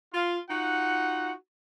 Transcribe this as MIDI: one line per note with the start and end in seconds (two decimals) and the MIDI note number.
0.13 0.39 65
0.50 1.33 63
0.50 1.33 65
0.50 1.33 66
0.50 1.33 78